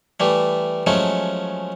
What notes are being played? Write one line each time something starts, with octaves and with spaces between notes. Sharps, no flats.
E3 G3 A3
F3 F#3 G#3 A3 C#4